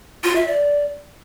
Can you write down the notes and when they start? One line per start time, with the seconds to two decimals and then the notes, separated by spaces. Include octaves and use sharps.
0.24 F4
0.36 E5
0.47 D5